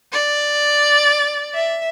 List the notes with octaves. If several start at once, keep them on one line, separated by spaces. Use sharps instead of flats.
D5
E5